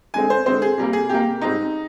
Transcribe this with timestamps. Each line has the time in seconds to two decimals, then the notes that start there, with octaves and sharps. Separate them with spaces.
0.14 D3 G#3 C4 G#5
0.30 C5
0.46 D3 G#3 C4 C5
0.62 G#4
0.78 C3 G3 A#3
0.93 G#4
1.09 C3 G3 A#3 G4
1.41 G#2 G3 C4 D#4